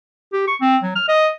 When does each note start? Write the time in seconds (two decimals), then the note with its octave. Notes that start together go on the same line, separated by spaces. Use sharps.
0.33 G4
0.47 C#6
0.61 C4
0.83 F#3
0.96 F6
1.08 D#5